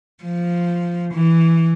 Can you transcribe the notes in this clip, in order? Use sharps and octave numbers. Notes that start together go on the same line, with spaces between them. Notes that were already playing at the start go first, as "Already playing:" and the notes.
F3
E3